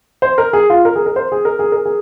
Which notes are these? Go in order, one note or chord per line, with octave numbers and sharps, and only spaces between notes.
C5
A#4
G#4
F4
A#4
G#4
A#4
C5
G#4
A#4
G#4
A#4
G#4